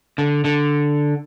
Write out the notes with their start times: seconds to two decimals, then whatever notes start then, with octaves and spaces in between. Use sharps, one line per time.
0.18 D3
0.44 D3